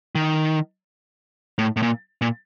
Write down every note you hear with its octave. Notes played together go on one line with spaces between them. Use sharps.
D#3
A2
A2
A#2
A#2